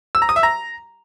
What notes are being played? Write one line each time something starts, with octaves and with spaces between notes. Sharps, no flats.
E6
A#5
D#6
E5
A#5